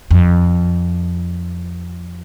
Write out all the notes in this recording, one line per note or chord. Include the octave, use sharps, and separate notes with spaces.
F2